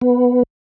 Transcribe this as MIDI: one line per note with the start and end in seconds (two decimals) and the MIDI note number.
0.01 0.43 59